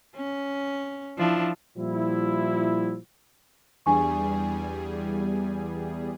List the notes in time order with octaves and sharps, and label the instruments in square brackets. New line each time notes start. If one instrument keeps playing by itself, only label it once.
[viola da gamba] C#4
F3 D4 E4
[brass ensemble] A#2 F3 G3 E4
[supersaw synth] E2 G3 G#4 [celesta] D4 G#5 C#6